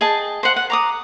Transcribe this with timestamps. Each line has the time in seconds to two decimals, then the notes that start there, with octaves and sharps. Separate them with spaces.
0.01 G#4 D#5 G5 A5
0.43 C5 F#5
0.56 F#5
0.70 A#5 D6 D#6